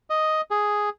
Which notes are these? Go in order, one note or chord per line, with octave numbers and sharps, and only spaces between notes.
D#5
G#4